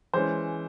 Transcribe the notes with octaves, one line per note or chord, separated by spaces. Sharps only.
E3 G#3 C#4 C5